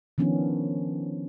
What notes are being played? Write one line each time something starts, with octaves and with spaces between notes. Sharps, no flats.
D#3 F3 B3 C#4 D4